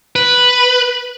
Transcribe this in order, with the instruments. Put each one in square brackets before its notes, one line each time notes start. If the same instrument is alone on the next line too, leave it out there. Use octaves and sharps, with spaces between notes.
[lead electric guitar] B4